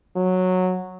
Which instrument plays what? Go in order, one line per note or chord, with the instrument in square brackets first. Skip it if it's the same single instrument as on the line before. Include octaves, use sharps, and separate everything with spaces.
[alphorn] F#3